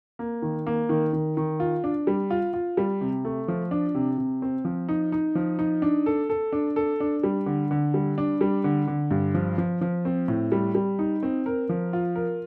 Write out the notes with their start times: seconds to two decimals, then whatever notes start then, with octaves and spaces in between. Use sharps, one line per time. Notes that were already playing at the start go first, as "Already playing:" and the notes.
0.19 A#3
0.42 D#3
0.67 A#3
0.89 D#3
1.13 D#3
1.37 D#3
1.60 F4
1.84 D4
2.07 G3
2.30 F4
2.54 F4
2.77 G3
3.01 C3
3.25 A3
3.48 F3
3.71 D4
3.95 C3
4.18 C3
4.42 C4
4.65 F3
4.89 D#4
5.12 D#4
5.35 F3
5.59 D#4
5.82 D4
6.06 A4
6.30 A4
6.53 D4
6.76 A4
7.00 D4
7.23 G3
7.46 D3
7.71 D3
7.94 G3
8.18 D4
8.41 G3
8.64 D3
8.87 D3
9.11 G2
9.34 F3
9.58 F3
9.81 F3
10.05 C4
10.28 A2
10.52 G3
10.75 G3
10.99 D#4
11.23 C4
11.46 A#4
11.69 F3
11.93 F4
12.16 A#4